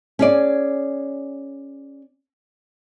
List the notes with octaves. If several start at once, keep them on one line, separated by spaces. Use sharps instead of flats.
C#4 G#4 D5